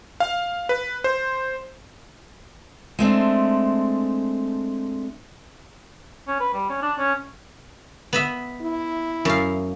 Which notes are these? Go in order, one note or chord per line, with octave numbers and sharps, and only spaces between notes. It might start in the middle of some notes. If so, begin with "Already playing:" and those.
F5
B4
C5
G#3 A3 C4 D4
C#4
B4
G3
C#4
D4
C#4
B3 D#5 E5
E4
F#2 F5